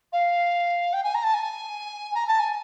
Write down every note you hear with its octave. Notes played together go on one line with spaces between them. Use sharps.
F5
G5
G#5
A#5
A5
G#5
A#5
A5
G#5